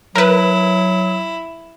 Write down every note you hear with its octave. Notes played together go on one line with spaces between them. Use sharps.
F#3 E4 A#4 B4